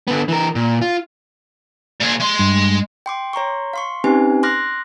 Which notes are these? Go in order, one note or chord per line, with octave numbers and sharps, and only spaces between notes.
D3 B3
E3 A#4
A#2
F4
A#2 G#4
G#3 C6
G2
G5 C6 D6
C#5 A#5 C6 C#6
F5 C6 C#6
C4 C#4 D#4 G4 B4 G#5
C6 D6 F6 F#6 A#6